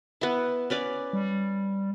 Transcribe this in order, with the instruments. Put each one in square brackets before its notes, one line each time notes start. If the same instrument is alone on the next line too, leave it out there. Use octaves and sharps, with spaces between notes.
[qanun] B3 E4
C#4 B4 D5
[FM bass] G3